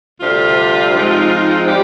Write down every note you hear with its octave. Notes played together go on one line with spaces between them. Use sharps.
D2 C3 G3 D4 F4
G#2 F3 G#3 C4 D#4
G3 G4